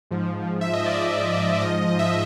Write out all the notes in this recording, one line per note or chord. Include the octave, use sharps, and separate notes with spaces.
G#2 F3
E5
D#5
D5
G#2 F3 D#5
E5